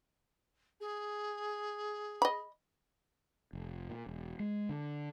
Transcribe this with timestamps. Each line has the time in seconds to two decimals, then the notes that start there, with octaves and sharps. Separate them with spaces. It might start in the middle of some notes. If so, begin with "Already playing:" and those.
0.80 G#4
2.22 D#5 B5
3.53 F1
3.89 A#2
4.07 E1
4.40 G#3
4.69 D3